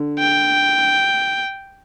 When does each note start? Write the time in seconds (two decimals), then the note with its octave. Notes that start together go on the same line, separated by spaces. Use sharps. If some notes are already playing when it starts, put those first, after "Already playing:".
Already playing: D3
0.19 G5